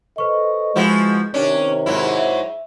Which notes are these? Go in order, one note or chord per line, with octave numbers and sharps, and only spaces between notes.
A4 B4 C5 D#5 C#6
F3 G#3 E4 F#4
C3 D#3 C#4 D4 C#5
G#2 F#3 E4
E5